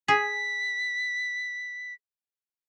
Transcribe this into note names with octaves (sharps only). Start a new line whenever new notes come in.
G#4 B6